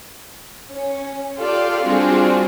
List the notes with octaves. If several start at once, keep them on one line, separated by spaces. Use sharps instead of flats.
C#4
F4 G4 A4 D5 F5
G3 C4 D4 F4 F#4 G#4